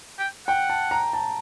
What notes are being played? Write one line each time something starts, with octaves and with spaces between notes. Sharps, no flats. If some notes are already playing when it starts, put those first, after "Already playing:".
G5
F#5 G5
A5
A#5
A5